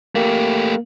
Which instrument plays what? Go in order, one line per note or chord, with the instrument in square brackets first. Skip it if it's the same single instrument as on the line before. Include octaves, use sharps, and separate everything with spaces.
[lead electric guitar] A3 G4 [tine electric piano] A#3